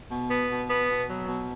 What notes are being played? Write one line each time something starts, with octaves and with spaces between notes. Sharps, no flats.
B2
B3
B2
B3
B2
F#3
B2